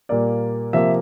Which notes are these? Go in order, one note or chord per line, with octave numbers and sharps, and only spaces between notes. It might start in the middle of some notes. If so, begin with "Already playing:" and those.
A#2 G3 A#3 D5
C3 F3 A#3 E5